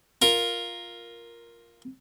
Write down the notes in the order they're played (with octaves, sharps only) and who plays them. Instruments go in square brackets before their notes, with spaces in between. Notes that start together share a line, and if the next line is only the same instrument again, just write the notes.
[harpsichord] F4 A#4